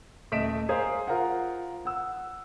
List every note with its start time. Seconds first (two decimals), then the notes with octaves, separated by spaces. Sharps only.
0.32 D#1 A3 D#5 B6 D7 E7
0.69 G#4 A#4 C5 F5
1.08 F4 A#4 C5 F5 F#5
1.85 F#5 E6